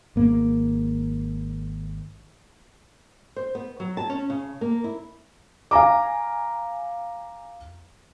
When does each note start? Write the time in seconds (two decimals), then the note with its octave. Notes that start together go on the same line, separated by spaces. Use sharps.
0.16 G#1 A#3
3.36 C5
3.55 B3
3.80 F#3
3.97 A5
4.10 C#4
4.30 C#3
4.61 A#3
4.84 E4
5.71 F5 G#5 A#5 D6